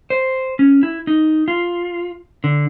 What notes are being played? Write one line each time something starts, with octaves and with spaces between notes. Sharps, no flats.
C5
C#4
E4
D#4
F4
D3